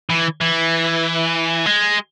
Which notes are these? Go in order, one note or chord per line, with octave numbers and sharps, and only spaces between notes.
E3
E3
G#3